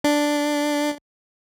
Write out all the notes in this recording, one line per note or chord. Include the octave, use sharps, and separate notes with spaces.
D4